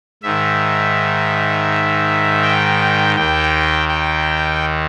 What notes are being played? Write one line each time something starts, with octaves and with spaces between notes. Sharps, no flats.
G#2 D#3 E5
G5
D#2 D#3 G5
G5